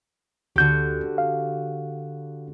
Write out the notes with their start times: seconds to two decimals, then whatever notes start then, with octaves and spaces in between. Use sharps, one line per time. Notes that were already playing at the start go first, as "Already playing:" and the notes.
0.56 D2 D3 F#4 G4 G6
1.18 F5